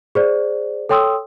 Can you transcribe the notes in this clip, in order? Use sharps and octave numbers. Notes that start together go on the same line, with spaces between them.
G#4 C5 D5
A4 C#5 G5 C6 D#6 E6